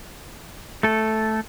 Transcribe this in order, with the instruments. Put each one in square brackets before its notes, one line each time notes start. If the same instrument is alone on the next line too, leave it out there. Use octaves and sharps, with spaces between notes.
[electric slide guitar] A3 A4